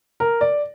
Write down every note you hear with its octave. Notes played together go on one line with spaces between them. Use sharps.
A#4
D5